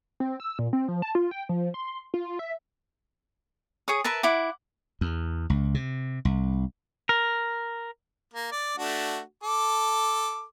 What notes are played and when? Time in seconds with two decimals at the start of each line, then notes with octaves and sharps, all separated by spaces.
0.20 C4
0.40 E6
0.59 A#2
0.73 C4
0.88 F3
1.02 A5
1.15 F4
1.31 G5
1.49 F3
1.74 C6
2.14 F4
2.39 E5
3.88 G#4 C#5 D#6
4.04 A#4 B4 E5 A5
4.23 E4 F#5 D6
5.01 E2
5.50 C#2
5.75 C3
6.25 C2
7.09 A#4
8.34 A#3
8.52 D5
8.78 A3 D4 F#4
9.43 A4 D6